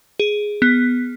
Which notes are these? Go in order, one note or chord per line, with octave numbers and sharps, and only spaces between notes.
G#4
B3